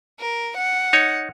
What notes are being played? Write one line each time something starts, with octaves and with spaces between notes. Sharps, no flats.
A#4
F#5
D#4 C#5